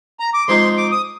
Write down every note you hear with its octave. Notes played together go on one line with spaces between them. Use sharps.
A#5
D6
G#2 F3 C4 D#4 C6
D6
D#6